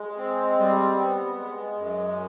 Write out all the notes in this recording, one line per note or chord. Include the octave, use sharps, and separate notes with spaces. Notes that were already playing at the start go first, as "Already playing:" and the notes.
Already playing: G#3
C4
G3
B3
G#3
F#2